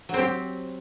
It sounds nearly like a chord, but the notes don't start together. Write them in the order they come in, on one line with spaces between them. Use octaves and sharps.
F#3 C4 G4